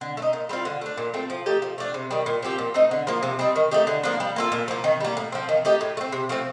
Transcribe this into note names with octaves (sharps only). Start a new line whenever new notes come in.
D3
A3
D#4
A#2
G3 C4 F4
D3
A3 D4
A#2
A3 C4 F4
F3
A3 D#4 G4
F3
A3 D4
C3
D#3 G3
A#2
F3 C4 G4
A#2
A3 C4 D#4
D3
F3 A#3
C3
G3 C4 D#4
D#3
A3 D#4 G4
D3
F3 A#3 D4
G3
A#3 F4 A4
A#2
F3 A#3
D#3
G3 A#3
A2
F3 C4
D#3
A3 D#4 G4
A2
A3
C4
C3
F3 A3 C4